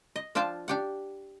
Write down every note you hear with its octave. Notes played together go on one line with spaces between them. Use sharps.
D#5
F3 D4 F4 G5 A5
D4 G4 F#5